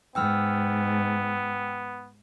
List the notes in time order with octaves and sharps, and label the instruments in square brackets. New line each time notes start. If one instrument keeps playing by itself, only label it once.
[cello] G#2 [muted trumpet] B3 [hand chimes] G5 E6 F6